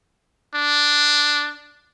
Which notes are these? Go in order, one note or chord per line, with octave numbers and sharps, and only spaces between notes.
D4